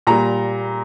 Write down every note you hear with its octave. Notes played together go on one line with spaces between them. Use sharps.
A#2 G3 A#5